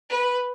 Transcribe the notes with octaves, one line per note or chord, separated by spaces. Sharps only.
B4